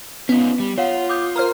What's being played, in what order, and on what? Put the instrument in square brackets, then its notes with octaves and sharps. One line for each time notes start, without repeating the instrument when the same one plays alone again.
[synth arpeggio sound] B3 [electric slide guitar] C#4 D#4 F4
[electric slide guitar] G3
[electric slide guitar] F4 [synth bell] C#5 F5 F#5
[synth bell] D6 D#6 G6
[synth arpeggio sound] A#4 C5 [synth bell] A#5 F6